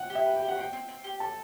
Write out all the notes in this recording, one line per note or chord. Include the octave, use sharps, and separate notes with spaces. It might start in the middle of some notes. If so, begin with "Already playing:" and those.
Already playing: F#5 G5
G4
E5
B4
G5
G4
F#5
C4 G5
C4
C4
G4
A4 A5